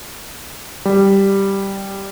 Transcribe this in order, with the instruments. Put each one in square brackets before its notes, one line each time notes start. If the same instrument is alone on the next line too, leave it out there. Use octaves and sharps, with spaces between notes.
[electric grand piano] G3